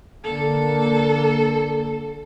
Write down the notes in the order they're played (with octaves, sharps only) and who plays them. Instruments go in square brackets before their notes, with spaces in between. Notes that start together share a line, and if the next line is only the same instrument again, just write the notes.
[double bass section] D3 A#3 [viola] A4